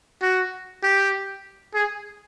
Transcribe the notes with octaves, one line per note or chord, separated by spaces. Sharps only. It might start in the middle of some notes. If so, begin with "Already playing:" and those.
F#4
G4
G#4